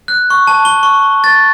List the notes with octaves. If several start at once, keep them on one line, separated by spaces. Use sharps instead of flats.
F#6
C#6
A5
G7
C#6
A6